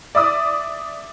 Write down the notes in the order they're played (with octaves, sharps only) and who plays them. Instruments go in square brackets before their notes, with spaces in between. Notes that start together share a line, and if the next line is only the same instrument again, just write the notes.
[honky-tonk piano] D5 E5 D6 D#6